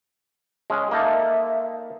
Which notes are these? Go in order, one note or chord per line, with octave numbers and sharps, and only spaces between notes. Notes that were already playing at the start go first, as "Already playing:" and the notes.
G#3 C#4
A#3 D#4 A4 E5